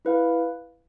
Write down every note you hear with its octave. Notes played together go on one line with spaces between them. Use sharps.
E4 B4 F5